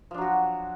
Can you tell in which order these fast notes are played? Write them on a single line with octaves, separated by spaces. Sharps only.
F3 D4 F#3 F#4